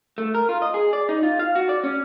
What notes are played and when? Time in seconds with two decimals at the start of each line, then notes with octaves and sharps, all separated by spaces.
0.18 A3
0.35 A#4
0.49 F4
0.62 D#5
0.74 G#4
0.93 D5
1.09 D#4
1.23 F4
1.39 F5
1.55 F#4
1.69 D5
1.84 C#4